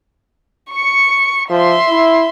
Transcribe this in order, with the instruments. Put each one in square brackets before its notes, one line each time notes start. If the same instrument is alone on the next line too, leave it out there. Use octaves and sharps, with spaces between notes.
[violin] C#6 C#7
[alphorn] F3 [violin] E5 C6
[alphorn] E4